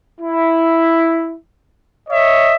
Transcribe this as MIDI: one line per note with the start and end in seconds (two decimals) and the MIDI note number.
0.20 1.35 64
2.09 2.55 73
2.09 2.55 75
2.09 2.55 76